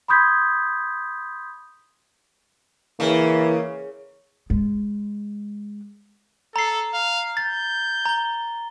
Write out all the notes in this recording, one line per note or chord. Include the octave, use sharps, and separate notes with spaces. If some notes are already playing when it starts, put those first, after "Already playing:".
B5 C6 D#6 G6 G#6 B6
C#3 E3 A#3
G#3
A4 A#5 C7
F5
G6 A6
A#5 G7